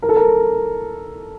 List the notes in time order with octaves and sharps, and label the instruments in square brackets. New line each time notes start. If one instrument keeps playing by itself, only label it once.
[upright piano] A#4
A4
A#4